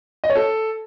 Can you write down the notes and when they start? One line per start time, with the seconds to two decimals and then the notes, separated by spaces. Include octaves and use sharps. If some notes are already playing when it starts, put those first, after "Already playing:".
0.24 D#5
0.29 C#5
0.35 A4